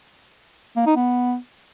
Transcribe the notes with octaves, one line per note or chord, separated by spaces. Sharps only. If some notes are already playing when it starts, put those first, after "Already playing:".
A#3
D#4
B3